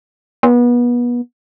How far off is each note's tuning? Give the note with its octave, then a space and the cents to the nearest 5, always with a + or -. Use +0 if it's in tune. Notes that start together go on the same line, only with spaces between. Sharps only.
B3 -30